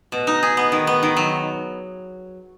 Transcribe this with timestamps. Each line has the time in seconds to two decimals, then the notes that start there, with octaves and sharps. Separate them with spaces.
0.12 B2
0.27 D#4
0.43 G#4
0.57 B3
0.72 D#3
0.87 B3
1.03 D#3
1.17 F#3